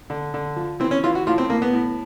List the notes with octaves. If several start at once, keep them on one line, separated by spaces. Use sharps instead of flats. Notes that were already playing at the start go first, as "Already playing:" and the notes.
D3
D3
F3
E3 C4
C#4
E3 F4
F#4
A2 F4
C4
A2 A#3
B3
A2